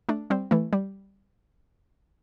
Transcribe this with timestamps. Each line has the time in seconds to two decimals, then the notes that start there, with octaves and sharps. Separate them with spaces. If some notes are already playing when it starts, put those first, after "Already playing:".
0.09 A3 D4
0.30 G3 C4
0.51 E3 A3
0.73 G3